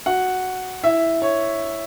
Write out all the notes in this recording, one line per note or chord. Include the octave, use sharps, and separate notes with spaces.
F#4 F#5
E4 E5
C#5